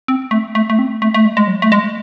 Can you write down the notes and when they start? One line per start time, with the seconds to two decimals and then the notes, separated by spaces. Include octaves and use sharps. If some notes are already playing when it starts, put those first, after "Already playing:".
0.08 C4
0.31 A3
0.55 A3
0.70 A3
0.79 C4
1.02 A3
1.14 A3
1.25 G#3
1.37 G#3
1.47 F#3
1.62 A3
1.72 G#3